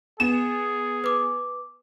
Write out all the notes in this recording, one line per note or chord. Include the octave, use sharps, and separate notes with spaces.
B3 G#4 E7
B4 D6